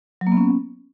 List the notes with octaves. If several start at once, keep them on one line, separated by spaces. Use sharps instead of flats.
F#3
A#3
B3
C#4